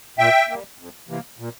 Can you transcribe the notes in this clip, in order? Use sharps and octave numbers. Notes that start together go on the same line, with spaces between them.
A#2 E5 G5
G3 A#3
F2
C3 E3 A#3
A#2